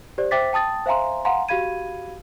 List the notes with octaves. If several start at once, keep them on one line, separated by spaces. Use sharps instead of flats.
G4 C5 D5
C5 E5 G5 D6 A6 B6
G5 A5 D#6 A6
C5 E5 F5 G#5 A#5 C6
F5 F#5 G#5 A#5 C6
F#4 G4 F5 B5 G#6 D#7